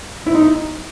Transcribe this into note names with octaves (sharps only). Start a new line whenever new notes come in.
E4
D#4